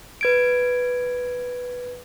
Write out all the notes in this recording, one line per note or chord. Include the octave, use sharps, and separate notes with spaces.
B4 G#6 D7